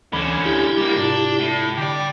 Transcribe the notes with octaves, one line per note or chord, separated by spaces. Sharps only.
D2 D3 E3 C#4 B5
E4 G4
G3 A#3
G#2 C3 D4 F4
A2
D3 G4 D5